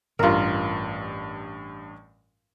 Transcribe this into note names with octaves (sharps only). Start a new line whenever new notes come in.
A1 G2 F4 A#4